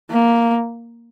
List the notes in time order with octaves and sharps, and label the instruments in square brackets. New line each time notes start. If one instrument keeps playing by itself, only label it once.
[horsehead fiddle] A#3